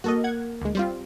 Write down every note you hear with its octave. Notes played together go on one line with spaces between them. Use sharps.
A#3 F#4 A4 D#5
F#5 G#6
D2 G#3
G3 C4 F4